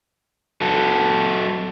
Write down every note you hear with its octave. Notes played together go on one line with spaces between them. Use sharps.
F#3 F#4 A4